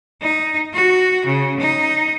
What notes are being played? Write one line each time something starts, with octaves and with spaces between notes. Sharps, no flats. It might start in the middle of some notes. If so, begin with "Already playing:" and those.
D#4
F#4
C#3
D#4